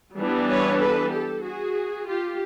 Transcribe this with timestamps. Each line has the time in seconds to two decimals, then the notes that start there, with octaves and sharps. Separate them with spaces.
0.17 E3 G3 B3 D4
0.48 B4 C#5
0.80 A4 B4
1.11 G4 A4
1.43 F#4 G#4
2.06 F4 G4